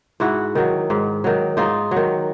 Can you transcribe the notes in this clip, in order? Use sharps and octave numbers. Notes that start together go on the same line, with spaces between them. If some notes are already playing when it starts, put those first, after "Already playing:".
G#2 E4 F#4
D#3 F#3
G#2
D#3 F#3
G#2 D#4 F4
F#3
D#3